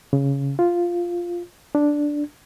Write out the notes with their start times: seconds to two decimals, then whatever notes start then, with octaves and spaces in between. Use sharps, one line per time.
0.13 C#3
0.59 F4
1.75 D4